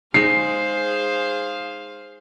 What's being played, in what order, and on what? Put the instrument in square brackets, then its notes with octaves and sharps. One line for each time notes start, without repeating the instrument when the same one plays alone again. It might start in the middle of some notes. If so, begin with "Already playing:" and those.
[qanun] G#3 D#4 [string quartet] G#4 C5 F5 [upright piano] C7